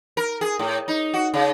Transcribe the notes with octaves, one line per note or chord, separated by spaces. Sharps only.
A#4
G#4
A2
D#4
F#4
C#3